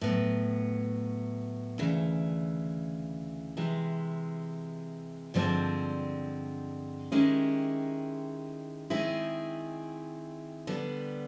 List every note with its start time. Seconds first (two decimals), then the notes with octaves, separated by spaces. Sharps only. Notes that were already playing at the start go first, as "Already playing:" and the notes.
0.01 A2 F#3 B3
1.78 D2 C#3 E3
3.57 C3 E3 G#3
5.34 G2 D3 F3 G#3 C4
7.12 D#3 G#3 C#4 E4 G4
8.90 D#3 G#3 C4 E4 G#4
10.67 D3 G3 B3